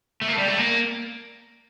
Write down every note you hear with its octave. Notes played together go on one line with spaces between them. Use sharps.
A3
A#3
A3
G3
A3
A#3